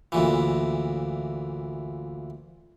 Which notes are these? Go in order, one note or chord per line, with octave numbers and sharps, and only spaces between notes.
D2 A#2 E3